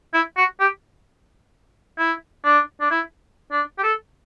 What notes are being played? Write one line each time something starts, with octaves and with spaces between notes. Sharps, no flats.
E4
F#4
G4
E4
D4
D4
E4
D4
G4
A4